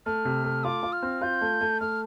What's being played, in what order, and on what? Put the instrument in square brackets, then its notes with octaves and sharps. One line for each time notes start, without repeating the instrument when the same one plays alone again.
[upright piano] A3 [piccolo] F6
[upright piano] C3
A3
[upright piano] F4 [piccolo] D6
[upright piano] F4
[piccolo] F6
[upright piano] C4
[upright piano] F4 [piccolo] G6
[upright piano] A3
A3
[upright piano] A3 [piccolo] F6